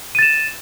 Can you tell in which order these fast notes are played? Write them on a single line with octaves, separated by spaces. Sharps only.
D#7 A6 E7